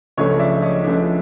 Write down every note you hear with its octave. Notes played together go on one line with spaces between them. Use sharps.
C#2 C#3 F3 A3 D4 C#5 D#5
D5 E5
C#5 D#5
C#2 C#3 F3 A3 D4